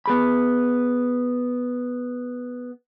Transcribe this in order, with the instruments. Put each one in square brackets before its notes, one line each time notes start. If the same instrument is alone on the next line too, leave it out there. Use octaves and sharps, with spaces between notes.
[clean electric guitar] B3 G#4 B5